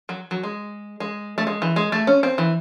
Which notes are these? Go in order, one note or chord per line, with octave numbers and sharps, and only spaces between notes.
F#3
F#3
G#3
G#3
A3
G#3
E3
G#3
A3
C#4
C4
E3